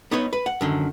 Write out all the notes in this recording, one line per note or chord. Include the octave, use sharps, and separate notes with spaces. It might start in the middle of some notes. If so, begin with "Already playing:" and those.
B3 D#4 B4 C#5
B4
F#5
F#2 D3 D#3